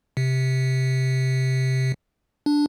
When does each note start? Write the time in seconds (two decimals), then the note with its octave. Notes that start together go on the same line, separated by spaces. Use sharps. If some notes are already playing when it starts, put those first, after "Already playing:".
0.17 C3
2.46 D4